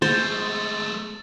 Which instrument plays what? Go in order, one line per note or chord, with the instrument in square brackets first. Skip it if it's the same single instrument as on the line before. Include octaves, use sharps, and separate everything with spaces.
[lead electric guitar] G#3 A3 [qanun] C5 [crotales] A6